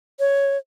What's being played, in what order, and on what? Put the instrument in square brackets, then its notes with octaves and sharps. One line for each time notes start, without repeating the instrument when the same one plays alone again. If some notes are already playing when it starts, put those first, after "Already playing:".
[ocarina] C#5